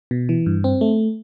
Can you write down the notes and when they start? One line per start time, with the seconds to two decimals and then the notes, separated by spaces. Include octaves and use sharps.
0.11 B2
0.29 E3
0.46 G2
0.64 C4
0.81 A3